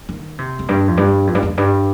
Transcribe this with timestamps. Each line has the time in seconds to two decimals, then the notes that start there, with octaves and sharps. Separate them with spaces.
0.09 D#3
0.38 C3
0.59 F2
0.69 G2
0.88 F2
0.97 G2
1.27 F2
1.35 G2
1.43 F2
1.58 G2